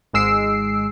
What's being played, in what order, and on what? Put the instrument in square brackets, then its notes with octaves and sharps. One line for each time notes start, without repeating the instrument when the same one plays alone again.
[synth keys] G#1 G#2 G#3 E6 C7 D7